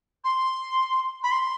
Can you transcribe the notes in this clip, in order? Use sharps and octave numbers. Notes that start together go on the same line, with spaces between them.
C6
B5
C6